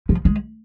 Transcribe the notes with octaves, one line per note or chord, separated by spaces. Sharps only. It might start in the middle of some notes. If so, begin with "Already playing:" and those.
F3
G#3